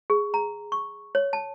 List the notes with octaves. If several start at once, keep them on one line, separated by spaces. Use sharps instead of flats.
G#4
A#5
C#6
C#5
A5